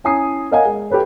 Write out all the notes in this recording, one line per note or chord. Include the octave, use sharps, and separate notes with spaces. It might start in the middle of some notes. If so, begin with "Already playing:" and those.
C#4 E4 G#5 A#5 D#6 C7
A#4 C#5 D#5 F5 F#5 G#5
G#3
G4 A4 B4 C#5